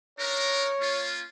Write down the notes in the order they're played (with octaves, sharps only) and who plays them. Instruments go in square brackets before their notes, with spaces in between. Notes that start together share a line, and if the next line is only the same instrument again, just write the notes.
[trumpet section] D4 D#4 A#4 [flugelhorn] C#5
[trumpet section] A#3 C#4 F4